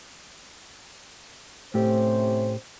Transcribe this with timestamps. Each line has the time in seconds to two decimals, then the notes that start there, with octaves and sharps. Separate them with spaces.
1.74 A2 C3 A3 C#4 G4 C5